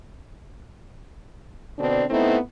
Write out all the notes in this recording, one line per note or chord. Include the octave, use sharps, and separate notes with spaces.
B2 D3 C4 D4
A3 B3 C4 D#4 E4